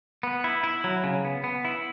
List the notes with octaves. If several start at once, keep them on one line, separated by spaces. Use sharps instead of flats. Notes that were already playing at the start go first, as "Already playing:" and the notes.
B3
E4
E4
F#3
C#3
B3
B3
E4